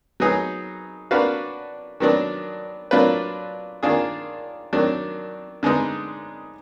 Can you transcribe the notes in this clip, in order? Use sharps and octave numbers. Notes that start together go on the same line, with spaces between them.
F#3 B3 D#4 G#4
A#3 D4 F#4 B4 F5
D#3 F#3 B3 D4
F#3 A#3 D4 F4 B4
D#3 A#3 D4 F4 G#4
D#3 F#3 D4
D3 G#3 B3 D#4